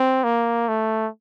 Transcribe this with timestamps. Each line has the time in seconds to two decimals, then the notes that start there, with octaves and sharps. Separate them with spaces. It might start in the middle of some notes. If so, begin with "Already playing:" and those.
Already playing: C4
0.24 A#3
0.68 A3